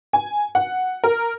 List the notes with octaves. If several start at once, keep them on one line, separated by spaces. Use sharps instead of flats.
G#5
F#5
A#4